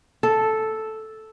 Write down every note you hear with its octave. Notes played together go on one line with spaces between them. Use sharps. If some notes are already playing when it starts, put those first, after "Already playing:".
A4